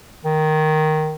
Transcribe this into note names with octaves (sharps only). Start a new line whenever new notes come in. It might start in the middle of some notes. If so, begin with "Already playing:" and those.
D#3